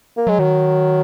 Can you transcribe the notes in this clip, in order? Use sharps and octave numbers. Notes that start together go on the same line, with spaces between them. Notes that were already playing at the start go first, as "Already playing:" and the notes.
A#3
F#3 G#3
D#3 F#3